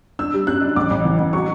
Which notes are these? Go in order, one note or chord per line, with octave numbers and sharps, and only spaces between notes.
D4 E6
G3
F#2 F#6
D4
A1 D6
A1
E3
A1
F#3 C#6